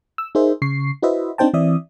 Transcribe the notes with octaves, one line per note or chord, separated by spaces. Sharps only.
E6
D#4 G#4 A#4 C5 E5
C#3 C#6 C7
E4 F#4 B4 C5 D#5 E5
C4 D4 D#4 C5 G5 A5
E3 C4 D5 E5 D#6